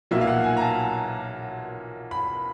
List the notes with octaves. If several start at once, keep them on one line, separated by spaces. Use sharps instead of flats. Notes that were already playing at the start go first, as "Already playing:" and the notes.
B1 A#2 F#3 A#3 E5
F5
F#5
G#5
A#5
A5
B5